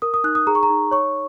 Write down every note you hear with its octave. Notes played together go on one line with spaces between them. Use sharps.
A#4 D#6
D#6
D#4 F#6
D#6
G#4 A#5
C#6
A#5
D#4
C#5 C#6